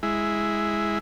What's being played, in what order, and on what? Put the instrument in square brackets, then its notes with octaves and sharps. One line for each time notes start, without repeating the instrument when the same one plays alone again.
[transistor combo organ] G#3 E4